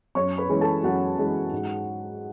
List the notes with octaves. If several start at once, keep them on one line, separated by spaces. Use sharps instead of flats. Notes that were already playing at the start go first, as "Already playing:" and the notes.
F#2 C#5 C#6
B4 B5
E3 G#3 C#4
A4 A5
F#2 F#4 F#5
E3 G#3 C#4
G#2